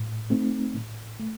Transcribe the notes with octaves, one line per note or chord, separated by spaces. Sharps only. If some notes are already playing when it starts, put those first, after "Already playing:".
Already playing: A2
A3 C4 D#4
A2
A3